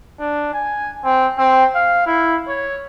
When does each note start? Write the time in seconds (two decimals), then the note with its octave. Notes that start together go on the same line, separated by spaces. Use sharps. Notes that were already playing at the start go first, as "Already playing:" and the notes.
0.19 D4
0.53 G#5
1.05 C4
1.38 C4
1.75 F5
2.06 E4
2.48 C#5